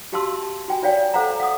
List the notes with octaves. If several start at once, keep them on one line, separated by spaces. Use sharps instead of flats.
F#4 G4 F5 A5 C6 E6
A5
F#4 G5 G#5
F4 C#5 D5 F5 G5
A4 C5 F5 F#5 A#5
F5 F#5 D#6